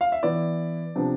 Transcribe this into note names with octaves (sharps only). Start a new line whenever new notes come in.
F5
E5
E3 B3 E4 D5
C3 F3 B3 D4